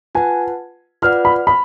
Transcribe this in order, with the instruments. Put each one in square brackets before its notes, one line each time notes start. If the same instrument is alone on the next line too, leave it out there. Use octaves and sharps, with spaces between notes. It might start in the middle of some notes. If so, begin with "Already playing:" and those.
[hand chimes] F4 B4 F#5 A5 [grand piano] G#5
[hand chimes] F4 B4 D5 F#5 [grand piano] F6
[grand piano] B5
B5